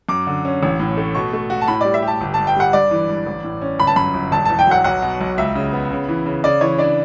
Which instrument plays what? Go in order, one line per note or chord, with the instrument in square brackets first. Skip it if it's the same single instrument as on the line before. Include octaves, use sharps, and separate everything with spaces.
[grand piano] F#2 [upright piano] D6
[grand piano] D3
C#4
A1
A2
A3
[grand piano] B2 [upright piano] C#6
[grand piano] A3
F#4
[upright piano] A5
[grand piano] A2 [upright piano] B5
[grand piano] G3 [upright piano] D5
[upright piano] E5
[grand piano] G4
[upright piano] A5
[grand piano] G1
[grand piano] G2 [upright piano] A5
[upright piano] G5
[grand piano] G3 [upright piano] F#5
[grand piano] G2 [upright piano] D5
[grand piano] E3
G2
A1
A2
C#4
[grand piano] G1 [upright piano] B5
[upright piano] A5
[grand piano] F#2 [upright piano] B5
[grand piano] G1
[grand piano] E1 [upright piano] A5
[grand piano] E2 [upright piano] A5
[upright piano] G5
[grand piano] F#3 [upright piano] F#5
[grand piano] B1 [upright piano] F#5
[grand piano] B2
B1
[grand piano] C#2 [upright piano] E5
[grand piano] C#3
B3
C#3
E3
C#3
[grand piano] C#3 [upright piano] D5
[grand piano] E3 [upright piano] C#5
[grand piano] D4 [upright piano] D5